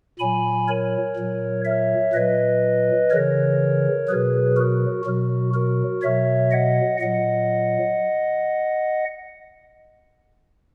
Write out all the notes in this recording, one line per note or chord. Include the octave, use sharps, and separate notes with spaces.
A#2 F#3 G#5 B5
A#4 C#5
A#2 F#3
C#5 E5
A#2 F#3 B4 D#5
C#3 E3 A#4 C#5
B2 F#3 G#4 B4
F#4 A#4
B2 F#3 F#4
F#4 A#4
B2 F#3 C#5 E5
D#5 F#5
A#2 F#3 D#5 F#5